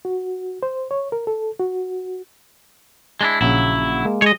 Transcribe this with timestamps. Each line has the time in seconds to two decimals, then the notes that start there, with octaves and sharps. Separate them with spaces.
0.05 F#4
0.63 C5
0.91 C#5
1.12 A#4
1.27 A4
1.59 F#4
3.21 G#3 D4 E4
3.41 A#1 C#3 F#3 E4
4.05 G#3 A#3
4.22 G#3 C#5 D#5